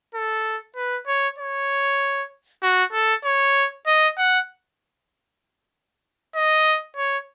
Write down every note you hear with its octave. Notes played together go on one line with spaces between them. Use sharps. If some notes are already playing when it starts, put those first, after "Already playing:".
A4
B4
C#5
C#5
F#4
A4
C#5
D#5
F#5
D#5
C#5